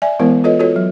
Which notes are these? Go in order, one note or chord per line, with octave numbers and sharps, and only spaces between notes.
D5 E5 G#5
E3 G#3 B3 E4 A#4 C5
F4 A4 B4 C#5 D#5
F4 F#4 A4 C#5
F#3